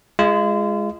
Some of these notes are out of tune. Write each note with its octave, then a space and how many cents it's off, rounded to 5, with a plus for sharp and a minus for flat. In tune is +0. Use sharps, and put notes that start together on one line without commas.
G#3 +0 F4 -35